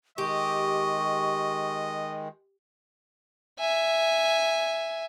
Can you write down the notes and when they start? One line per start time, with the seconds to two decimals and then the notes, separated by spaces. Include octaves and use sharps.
0.18 D#3 G#3 G4 D#5 C#6
3.60 E5 G#5